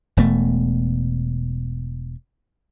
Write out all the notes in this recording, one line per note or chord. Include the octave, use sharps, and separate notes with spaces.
E1 B2 A3